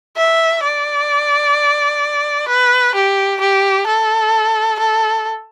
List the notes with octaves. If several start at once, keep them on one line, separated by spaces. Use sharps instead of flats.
E5
D5
B4
G4
G4
A4
A4